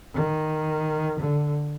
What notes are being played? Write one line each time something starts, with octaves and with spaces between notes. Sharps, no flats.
D#3
D3